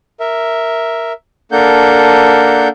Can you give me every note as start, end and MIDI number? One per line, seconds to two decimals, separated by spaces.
0.20 1.13 70
0.20 1.13 76
1.52 2.68 58
1.52 2.68 62
1.52 2.68 69
1.52 2.68 70
1.52 2.68 78
1.52 2.68 91